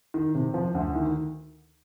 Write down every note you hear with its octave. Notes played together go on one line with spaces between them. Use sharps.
D#3
C3
F3
D2
D#3